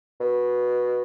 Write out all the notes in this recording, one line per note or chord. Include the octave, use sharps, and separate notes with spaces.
B2